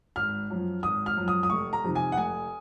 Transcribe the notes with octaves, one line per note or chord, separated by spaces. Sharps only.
G#1 F6
F#2 F3
G#1 D#6
F6
F#2 F3
D#6
D#6
F1 C#6
A#5
F2 C3 D#3
G#5
F#5
F1 G#5